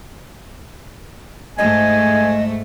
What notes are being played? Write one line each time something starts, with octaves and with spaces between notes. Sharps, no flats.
G#2 A3 D#5 G#5